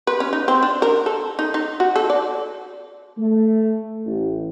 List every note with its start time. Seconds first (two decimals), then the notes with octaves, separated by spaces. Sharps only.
0.07 B4
0.20 C#4
0.33 D#4
0.48 C4
0.63 D4
0.82 A#4
1.06 A4
1.39 D#4
1.54 D#4
1.80 F#4
1.96 A4
2.10 D5
3.18 A3
4.06 A1